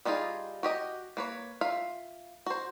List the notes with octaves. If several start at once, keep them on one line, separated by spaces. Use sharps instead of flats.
G3 D4 D#4 F4 G#4
F#4 G4 D#5
A#3 B4 C#5
F4 E5 F5
F#4 C5